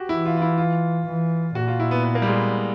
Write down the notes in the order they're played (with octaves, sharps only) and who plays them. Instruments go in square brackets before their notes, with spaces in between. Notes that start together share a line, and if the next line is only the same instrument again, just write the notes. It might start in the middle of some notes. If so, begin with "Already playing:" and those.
Already playing: [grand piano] F#4 G4
[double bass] E3 [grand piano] E4
[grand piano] F4
F4
E4
F4
[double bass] E3
[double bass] A#2 [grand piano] F#4
[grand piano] F4
E4
B3
B3
A#3
G3
G#3